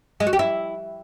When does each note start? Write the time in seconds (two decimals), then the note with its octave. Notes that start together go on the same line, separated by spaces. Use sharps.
0.20 G#3
0.27 F#4
0.33 G4
0.39 E4